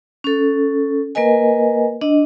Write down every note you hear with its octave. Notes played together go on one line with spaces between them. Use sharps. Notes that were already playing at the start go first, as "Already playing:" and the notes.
C#4 A4
A#3 A#4 B4 D#5 G#5
D4 D#5